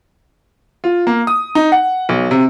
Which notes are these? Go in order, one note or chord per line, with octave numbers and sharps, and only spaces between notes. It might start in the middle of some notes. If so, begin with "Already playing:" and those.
F4
A#3
D#6
D#4
F#5
B1
C3